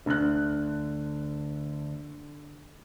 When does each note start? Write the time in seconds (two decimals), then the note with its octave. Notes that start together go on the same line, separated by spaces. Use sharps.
0.06 D2 D3 F#6